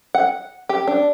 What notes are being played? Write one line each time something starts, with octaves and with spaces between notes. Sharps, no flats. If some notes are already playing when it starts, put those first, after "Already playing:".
F#5
G4
D4